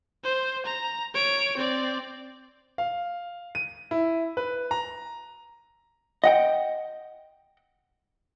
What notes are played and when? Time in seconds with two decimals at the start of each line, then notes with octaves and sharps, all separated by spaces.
0.24 C5
0.66 A#5
1.14 C#5 D7
1.57 C4 D5
2.78 F5
3.55 D#7
3.91 E4
4.37 B4
4.71 A#5
6.24 D#5 F#5 G5